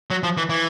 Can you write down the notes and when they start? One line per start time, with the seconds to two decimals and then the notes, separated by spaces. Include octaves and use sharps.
0.10 F#3
0.23 F3
0.37 E3
0.49 E3